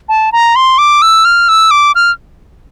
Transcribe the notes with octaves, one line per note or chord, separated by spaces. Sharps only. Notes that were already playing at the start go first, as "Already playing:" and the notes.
A5
A#5
C6
D6
E6
F6
E6
D6
F6